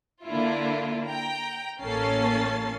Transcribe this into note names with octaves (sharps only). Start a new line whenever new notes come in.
D3 A#3 E4 F4
G5 A#5
A1 A#3 C#4 A4 A6 C7